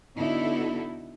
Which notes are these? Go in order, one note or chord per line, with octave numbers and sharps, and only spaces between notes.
D3 B3 D#4 E4 F#4 A4